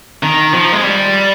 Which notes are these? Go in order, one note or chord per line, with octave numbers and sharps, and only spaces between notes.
D#3
F3
G#3
G3